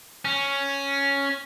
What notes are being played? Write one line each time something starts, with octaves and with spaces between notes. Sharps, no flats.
C#4